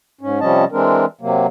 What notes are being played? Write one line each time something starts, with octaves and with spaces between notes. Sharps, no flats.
G#2 C#4
C3 F3 G3 C#4 D#5 A5
E3 G#3 C4 D4 A#4
C3 F#3 A#3